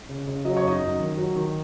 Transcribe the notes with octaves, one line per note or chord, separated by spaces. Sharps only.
C#3
C#3
F#3 D#5
C#5
F#2 D#4 D#5
F#2
D#3
F#3
D#3